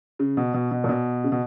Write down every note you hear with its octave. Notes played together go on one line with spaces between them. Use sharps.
C#3
B2
B2
B2
A#2
B2
C#3
B2